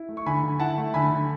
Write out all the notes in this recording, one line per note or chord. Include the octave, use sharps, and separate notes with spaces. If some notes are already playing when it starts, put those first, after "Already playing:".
Already playing: E4
A3
C#6
D3 G#5 B5
D3
E4 F#5 A5
A3
D3 G#5 B5
D3